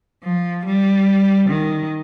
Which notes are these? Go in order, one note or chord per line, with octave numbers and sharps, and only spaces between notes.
F3
G3
D#3